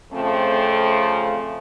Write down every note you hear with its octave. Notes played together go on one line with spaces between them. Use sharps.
F2 C#3 F3 A3 C4